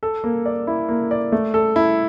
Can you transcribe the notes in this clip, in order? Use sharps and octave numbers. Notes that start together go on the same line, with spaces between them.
A4
A#3
D5
E4
A#3
D5
A3
A4
E4